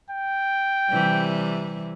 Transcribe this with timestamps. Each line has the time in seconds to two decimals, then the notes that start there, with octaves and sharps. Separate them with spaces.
0.10 G5
0.89 C3 E3 G3